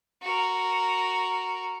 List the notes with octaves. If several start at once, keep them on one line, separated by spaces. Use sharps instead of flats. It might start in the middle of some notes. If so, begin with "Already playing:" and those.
F#4 A#4